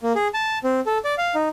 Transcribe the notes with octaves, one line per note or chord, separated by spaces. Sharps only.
A#3
G#4
A5
C4
A4
D5
F5
D#4